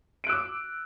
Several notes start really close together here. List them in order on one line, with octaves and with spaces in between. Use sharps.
D7 F#6 E6 D6